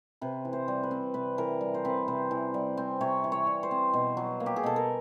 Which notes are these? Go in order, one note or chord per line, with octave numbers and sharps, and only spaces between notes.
C3 B4
E3
C5
G3
B4
C4
C3 B4
E3 A#4
G3
C5
C4 B4
C3 C5
E3
G3
C4
C3 C#5
E3
C#5
G3
C5
C4
B2
F#3
A#3
G4
G#4
B2 A4
A#4